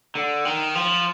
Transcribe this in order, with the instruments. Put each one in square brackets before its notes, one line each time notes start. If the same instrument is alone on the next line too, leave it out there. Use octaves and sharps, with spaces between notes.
[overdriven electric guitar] D3
D#3
F3